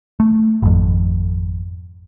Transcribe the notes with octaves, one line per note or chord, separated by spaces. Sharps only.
A3
G#1 F2